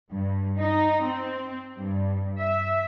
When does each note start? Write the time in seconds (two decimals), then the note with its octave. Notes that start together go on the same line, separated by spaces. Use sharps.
0.12 G2
0.59 D#4
1.04 C4
1.79 G2
2.39 E5